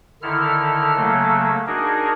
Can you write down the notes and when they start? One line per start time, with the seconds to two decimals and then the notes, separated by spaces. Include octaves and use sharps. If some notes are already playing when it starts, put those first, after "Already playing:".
0.22 D3 D#3 E4 A4 F6
0.95 C#3 F#3 A3 A#3 A4
1.67 D4 D#4 F#4 G#4 A#4